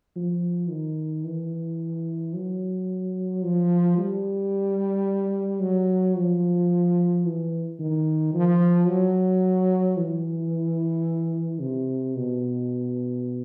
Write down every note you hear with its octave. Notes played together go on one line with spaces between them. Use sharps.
F3
D#3
E3
F#3
F3
G3
F#3
F3
E3
D#3
F3
F#3
E3
C3
B2